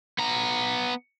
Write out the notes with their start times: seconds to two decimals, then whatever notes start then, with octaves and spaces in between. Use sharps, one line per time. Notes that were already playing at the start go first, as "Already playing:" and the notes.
0.18 B3 A#5